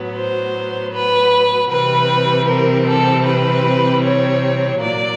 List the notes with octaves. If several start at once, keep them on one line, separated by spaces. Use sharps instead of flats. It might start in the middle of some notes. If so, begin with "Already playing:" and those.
Already playing: A2 F#3 B3
C5
B4
C3 E3 G3 C4 B4
A#4
A4
B4
C#5
A#2 F#3 A#3 D5